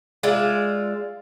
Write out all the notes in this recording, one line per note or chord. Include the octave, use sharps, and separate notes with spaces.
G#3 F4 D5 E5